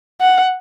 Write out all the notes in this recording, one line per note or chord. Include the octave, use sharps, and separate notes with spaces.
F#5